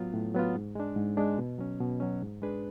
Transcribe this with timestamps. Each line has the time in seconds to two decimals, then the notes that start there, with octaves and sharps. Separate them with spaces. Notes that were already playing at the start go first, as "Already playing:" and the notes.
Already playing: A2 F#3 B3 F4
0.13 A2
0.35 F#3 B3 F4
0.56 G#2
0.75 G#3 D4
0.96 G#2
1.17 G#3 D4
1.38 B2
1.59 F#3 C#4
1.80 B2
2.00 F#3 C#4
2.22 G#2
2.42 G#3 D4 G#4 B4